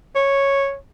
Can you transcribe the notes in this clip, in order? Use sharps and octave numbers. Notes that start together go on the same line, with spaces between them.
C#5